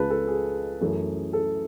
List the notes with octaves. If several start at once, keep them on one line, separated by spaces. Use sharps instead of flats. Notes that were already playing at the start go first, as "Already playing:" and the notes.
Already playing: C#2 C#3 G#3 B4 A5
A4
G#4
F#2 E3 A3
A4